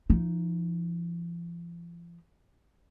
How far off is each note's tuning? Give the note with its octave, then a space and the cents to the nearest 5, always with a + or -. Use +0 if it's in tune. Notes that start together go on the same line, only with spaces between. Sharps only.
F3 -40 D#4 +0